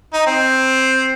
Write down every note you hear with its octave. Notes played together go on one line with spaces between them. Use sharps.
D#4
C4